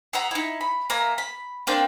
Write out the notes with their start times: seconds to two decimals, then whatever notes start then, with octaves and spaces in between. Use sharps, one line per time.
0.13 G#4 E5 F#5 A#5
0.31 D#4 E4
0.61 B5
0.90 A#3 E5 G#5 A#5
1.18 B5
1.67 A#3 C4 D4 G5